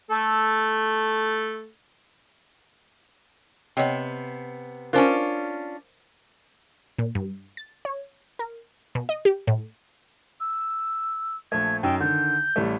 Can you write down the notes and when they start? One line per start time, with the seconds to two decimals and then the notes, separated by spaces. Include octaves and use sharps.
0.11 A3 A4
3.77 C3 B3 C#5 D#5 G5
4.93 C#4 D4 F4 A#4 C5 G#5
6.98 A#2
7.15 G2
7.57 A6
7.85 C#5
8.39 A#4
8.95 B2
9.09 D#5
9.25 G4
9.47 A2
10.40 E6
11.52 A#1 A3 G#6
11.83 F#2 D#4 G5 E6
12.00 D3 D#3 G6
12.56 A1 G3 A3